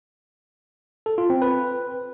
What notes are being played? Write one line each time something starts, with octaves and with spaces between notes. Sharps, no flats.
A4
F4
C4
B4